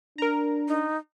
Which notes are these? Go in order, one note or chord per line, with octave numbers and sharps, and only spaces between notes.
D4 A#4 A#5
D#4